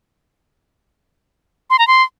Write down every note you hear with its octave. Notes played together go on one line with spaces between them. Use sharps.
C6
A#5
C6